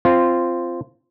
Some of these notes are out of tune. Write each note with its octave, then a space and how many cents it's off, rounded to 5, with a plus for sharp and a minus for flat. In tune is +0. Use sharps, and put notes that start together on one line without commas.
C4 +0 F4 -10